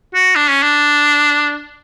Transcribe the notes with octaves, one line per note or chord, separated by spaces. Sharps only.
F#4
D4
C#4
D4